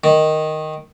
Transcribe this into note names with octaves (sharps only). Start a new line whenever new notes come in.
D#3